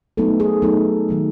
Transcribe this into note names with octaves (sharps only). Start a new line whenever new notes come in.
F#3 A3 B3 D#4 A4
G#4
F#3 A3 B3 D#4 A4
D#3 F#3 A3